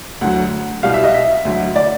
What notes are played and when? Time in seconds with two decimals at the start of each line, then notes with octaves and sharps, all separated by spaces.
0.21 D2 D3 F#3 F#5
0.83 C2 B2 G3 F5
0.94 E5
1.04 D#5
1.14 E5
1.45 D2 D3 F#3
1.76 D5